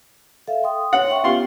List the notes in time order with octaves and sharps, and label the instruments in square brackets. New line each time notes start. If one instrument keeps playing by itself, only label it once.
[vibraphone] A4 E5 F5
G5 C6 D#6
[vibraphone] C#5 [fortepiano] F#5
[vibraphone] E5 G5 C#6
[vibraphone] B3 C#4 G4 [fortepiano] F4 C6